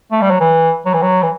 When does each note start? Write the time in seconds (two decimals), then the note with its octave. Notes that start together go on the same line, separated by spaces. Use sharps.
0.12 A3
0.22 G3
0.31 F#3
0.40 E3
0.86 F#3
0.94 E3
1.02 F#3
1.23 E3